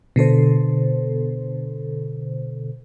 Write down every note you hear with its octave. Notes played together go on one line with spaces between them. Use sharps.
B2 D3 A4 C5